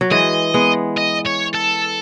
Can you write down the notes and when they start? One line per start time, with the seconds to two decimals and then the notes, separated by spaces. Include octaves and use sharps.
0.01 F#3
0.11 E3 G#3 D#5
0.54 G#3 B3
0.97 D#5
1.25 C#5
1.54 A4